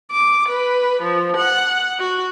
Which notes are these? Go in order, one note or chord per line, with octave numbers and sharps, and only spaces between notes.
D6
B4
F3
F#5
F#4